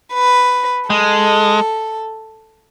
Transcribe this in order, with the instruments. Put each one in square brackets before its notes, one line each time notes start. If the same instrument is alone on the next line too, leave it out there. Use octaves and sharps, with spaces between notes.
[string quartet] B4
[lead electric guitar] G#3 [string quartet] A4